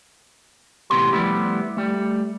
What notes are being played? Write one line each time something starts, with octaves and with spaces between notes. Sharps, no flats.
E2 A2 C3 B3 G4 C6
F3 G3 A3 B3 E4 G4
G3 A3